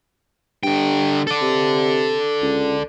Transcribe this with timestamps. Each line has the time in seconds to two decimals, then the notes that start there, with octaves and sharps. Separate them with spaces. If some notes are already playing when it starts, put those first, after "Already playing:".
0.63 G2 D3 G5
1.27 A4 D5
1.41 C3
2.42 C#2